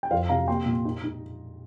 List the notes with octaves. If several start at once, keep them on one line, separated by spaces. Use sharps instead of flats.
G5
F2 C5 F5
C3 F5 A#5
A#3 G5 C6
A#2
D#4
D#4